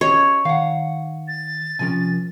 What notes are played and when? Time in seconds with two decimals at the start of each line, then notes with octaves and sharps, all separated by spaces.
0.01 C#4 G4 C#5 D#5
0.45 D#3 F5 F#5
1.28 A6
1.79 C3 F3 C#4 A#4 G#5